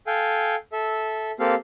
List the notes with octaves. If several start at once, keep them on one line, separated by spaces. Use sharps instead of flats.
A4 F5 G5 G#5
A4 E5
A#3 C4 G4 A4 F5